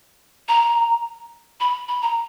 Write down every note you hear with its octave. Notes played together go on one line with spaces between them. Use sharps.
A#5
B5
B5
A#5